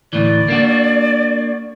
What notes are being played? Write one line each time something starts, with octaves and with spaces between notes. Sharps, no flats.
D2 A2 E3 D5
A#3 D4 F#4